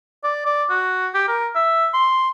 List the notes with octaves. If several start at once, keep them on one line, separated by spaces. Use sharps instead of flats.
D5
D5
F#4
G4
A#4
E5
C6